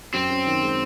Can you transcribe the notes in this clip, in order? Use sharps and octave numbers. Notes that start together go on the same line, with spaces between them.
F#2 C4
C#4
D#3
G#3